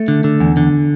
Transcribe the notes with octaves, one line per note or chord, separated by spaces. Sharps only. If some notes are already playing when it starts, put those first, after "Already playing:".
Already playing: A3
D3
D3
E2
D3